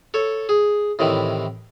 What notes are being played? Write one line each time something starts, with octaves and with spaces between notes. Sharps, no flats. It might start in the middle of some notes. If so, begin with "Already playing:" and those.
A4 C#5
G#4
A2 C3 D#3 E3